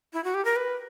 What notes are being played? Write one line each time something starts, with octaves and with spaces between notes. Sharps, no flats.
E4
F#4
G4
A#4
B4